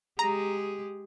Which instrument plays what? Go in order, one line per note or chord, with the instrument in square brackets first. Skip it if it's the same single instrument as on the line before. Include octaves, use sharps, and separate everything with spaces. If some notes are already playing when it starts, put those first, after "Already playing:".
[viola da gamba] G#3 G4 G#4 [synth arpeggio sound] A#5